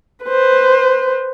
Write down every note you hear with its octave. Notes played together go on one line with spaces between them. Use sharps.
B4 C5